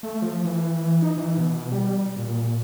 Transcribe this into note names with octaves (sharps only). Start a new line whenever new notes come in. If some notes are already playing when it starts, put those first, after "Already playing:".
A3
F3
E3
D#4
E3
B2
G3
A#2